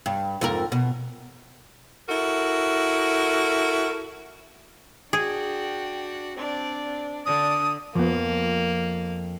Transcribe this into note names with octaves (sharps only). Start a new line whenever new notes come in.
G2
F2 G#2 A#4
B2
E4 F#4 A4 A#4
D4 F#4 G#4 G5
C4 D4 D5
D3 D4 D#6
F2 F3 A#3 B3